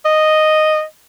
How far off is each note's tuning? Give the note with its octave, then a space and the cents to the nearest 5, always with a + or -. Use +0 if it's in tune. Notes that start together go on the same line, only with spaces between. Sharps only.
D#5 -5